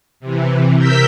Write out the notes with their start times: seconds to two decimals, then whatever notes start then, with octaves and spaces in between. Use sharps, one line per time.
0.20 C3 E3
0.76 C3 A#4 E6 G6 B6